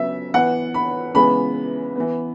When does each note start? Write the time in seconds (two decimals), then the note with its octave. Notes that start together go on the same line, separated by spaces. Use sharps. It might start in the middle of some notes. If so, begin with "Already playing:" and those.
Already playing: C#3 F#3 B3 E5
0.34 E3 B3 F#5
0.74 B5
1.14 C#3 E3 G#3 B3 B5
1.96 E3 B3